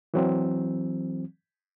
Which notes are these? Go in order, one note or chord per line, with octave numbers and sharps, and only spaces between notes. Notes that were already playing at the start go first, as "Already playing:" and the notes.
E3 F#3 C4